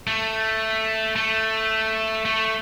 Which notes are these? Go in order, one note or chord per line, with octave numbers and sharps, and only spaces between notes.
A3
A3
A3